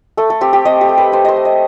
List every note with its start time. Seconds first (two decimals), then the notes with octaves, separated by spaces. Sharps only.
0.17 A3 A4
0.30 A4
0.41 C4 G4
0.53 G4
0.65 C4 D#5
0.81 G4
0.89 A3
0.97 B4
1.12 A3 C5
1.25 C5 D#5
1.36 A3
1.45 D#5